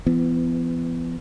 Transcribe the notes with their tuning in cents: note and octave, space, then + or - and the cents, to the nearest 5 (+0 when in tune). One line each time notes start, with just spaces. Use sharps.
E3 +45 B3 +25